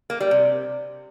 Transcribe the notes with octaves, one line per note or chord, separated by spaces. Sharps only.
A#3
G3
C3